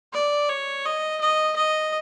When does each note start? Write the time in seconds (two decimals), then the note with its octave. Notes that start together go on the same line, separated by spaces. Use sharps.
0.13 D5
0.49 C#5
0.85 D#5
1.21 D#5
1.57 D#5